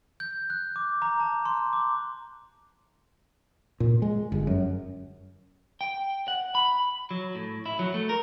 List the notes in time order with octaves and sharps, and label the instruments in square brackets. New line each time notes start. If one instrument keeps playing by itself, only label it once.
[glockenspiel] G6
F#6
D6
A#5
A5
C6
D6
[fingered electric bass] A#2
G#3
G1
F#2
[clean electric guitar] G5
F#5
B5
F#3
A2
E4
F#3
A3
A#4